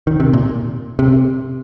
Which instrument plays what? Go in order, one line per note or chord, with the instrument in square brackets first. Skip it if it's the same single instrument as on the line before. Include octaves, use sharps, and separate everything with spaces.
[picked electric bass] D#3
C3
A#2
C3